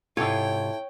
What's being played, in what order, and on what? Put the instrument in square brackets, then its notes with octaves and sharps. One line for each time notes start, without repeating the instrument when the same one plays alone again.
[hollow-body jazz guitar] G#2 C3 F4 [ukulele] E4 A4 [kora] C#5 [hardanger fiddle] G5